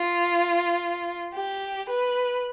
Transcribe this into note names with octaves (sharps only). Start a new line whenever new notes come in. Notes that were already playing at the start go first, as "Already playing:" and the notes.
Already playing: F4
G4
B4